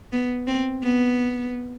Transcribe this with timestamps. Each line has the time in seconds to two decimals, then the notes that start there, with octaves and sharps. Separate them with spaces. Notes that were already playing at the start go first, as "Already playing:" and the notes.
0.12 B3
0.47 C4
0.83 B3